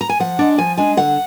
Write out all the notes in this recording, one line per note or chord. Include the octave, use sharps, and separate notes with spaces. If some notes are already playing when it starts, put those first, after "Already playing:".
A#5
G#5
F3 F#5
G#3 D4
F3 G#5
G#3 D4 G#5
D3 F#5